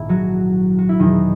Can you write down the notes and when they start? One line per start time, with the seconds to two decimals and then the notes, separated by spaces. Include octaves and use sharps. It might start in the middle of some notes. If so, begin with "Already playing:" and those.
Already playing: A#1 G#2 D#3 E4
0.09 F#3 F#4
0.78 F#4
0.89 E4
1.00 E2 B2 D#3 F#3 D#4